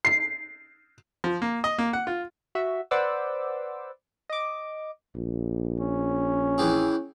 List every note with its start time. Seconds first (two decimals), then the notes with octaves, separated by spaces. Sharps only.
0.05 C7
1.24 F3
1.42 A#3
1.64 D#5
1.79 A#3
1.93 F#5
2.07 F4
2.55 F#4 E5
2.91 B4 C5 D5 F#5 D6 E6
4.30 D#5 D6
5.15 A#1
5.80 C#4
6.58 E3 G4 G#4